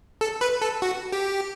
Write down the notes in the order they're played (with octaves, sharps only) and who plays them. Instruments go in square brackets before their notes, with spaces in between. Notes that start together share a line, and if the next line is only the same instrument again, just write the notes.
[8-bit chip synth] A4
B4
A4
F#4
G4